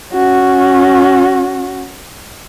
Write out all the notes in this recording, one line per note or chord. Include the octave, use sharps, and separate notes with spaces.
C#4 F#4